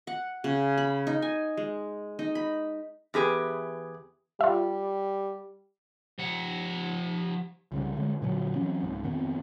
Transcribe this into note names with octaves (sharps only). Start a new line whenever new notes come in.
F#5
C#3
B5
D#4
G#5
G#3
D#4
B5
E2 G4 G#4 B4
G3 F4 E5
F3 F#5
C2 C#3 G3
D3 D#3 G#3
A#2 D3 F#3
E3 F#3 C4 C#4
C2 G#2
F2 D#3 B3 C4